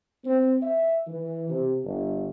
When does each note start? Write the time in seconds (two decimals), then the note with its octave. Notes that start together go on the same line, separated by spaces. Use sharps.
0.24 C4
0.63 E5
1.07 E3
1.48 C3
1.84 G1